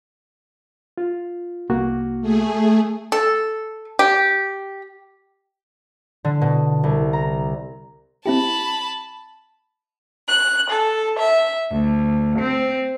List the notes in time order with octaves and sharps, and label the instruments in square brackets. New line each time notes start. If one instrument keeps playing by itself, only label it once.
[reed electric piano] F4
C2 A#3 F#4
[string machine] A3 G#4
[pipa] A4
G4
[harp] D3
B2
C2
A#5
[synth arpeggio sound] C4 E4 G4 [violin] A5 B5
[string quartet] F#6
A4
E5
D2
C4